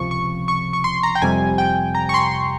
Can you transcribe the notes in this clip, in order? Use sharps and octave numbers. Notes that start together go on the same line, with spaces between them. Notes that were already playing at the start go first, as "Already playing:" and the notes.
Already playing: C#2 C3 F3 C#6
C#6
C#6
C#6
C6
A#5
G5
F2 C3 G3 G#5
G5
A#5
C#6
C6
C6